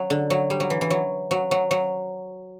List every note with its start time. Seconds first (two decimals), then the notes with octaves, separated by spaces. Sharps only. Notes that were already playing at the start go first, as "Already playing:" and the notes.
Already playing: F#3
0.10 D3
0.30 F#3
0.50 G3
0.60 F#3
0.70 E3
0.81 E3
0.90 F#3
1.31 F#3
1.51 F#3
1.71 F#3